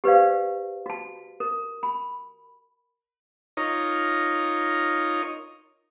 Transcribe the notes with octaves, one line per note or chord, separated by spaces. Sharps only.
G4 B4 C5 D5 F5
F#4 A5
A#4
B5
D#4 F4 A#4 C#5 D#5